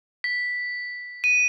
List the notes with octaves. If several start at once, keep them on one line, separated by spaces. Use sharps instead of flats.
B6
D#7